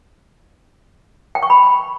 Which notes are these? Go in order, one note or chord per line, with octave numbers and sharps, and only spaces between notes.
G5
C#6
B5